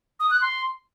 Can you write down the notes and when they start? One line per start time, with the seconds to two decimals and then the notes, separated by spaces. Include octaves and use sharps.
0.20 D#6
0.31 F#6
0.41 C6